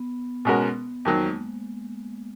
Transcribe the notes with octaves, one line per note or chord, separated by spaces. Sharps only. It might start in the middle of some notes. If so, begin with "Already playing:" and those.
Already playing: B3
B2 G#3 C#4 F#4 A#4
F2 D#3 F#3 A#3
G#3